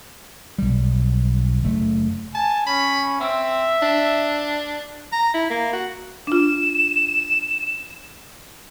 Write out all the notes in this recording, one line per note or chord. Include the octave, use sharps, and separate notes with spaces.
B1 G3
F#1 A3
G#5 A5
C#4 B5
C4 E5
D4
A#5
E4
A#3
F#4
D4 F4 E7